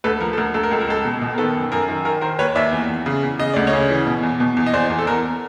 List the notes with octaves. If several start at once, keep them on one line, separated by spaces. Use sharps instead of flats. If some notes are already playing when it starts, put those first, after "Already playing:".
D2 A4 B4
F3 A#4
A4
D2 A#4
D2 A4
A#4
C#2 A4
A#4
C#2 A4
B2
B2
A#4
D#3 A4 B4
F#2
F#2 A#4
D#3
D#3 A#4
D#3 A#4 C5
D#2 B4 C#5
D#2 D5 E5
E2
E2
C#3
E2
C#3 D#5
D2 D5
C#5 D#5
C#3
E3
B2
E2
B2
E2
D#5
E2 C5 D5
E2
A4
E2 A#4